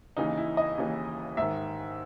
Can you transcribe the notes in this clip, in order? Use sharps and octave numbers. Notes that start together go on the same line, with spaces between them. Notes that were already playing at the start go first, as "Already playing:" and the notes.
D#2 C#3 E3 D#4
E4
D#5
D#2 C#3 E3
G#2 D#3 E5